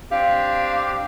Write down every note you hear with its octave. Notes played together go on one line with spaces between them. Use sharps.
C4 D4 G4 F5